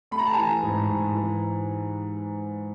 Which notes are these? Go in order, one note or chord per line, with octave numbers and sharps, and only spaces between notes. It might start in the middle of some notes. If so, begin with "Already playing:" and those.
A3 B5
A#5
A5
E3 G#5 A#5
G#2
G#2
E3